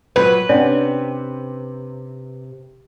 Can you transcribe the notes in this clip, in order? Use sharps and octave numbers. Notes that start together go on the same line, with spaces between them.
A#2 F#3 B4
C3 C#4 D4 C#5 D5 F#5